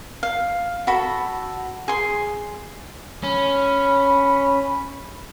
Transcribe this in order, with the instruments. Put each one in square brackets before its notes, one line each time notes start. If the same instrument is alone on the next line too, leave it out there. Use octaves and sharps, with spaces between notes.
[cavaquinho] F5
F#4 A4 B5
G#4 C6
[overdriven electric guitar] C#4 [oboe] B5